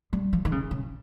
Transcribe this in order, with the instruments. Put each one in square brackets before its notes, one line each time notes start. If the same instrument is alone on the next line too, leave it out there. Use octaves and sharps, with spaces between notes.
[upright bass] G3
F3
D#3
C#3
C#3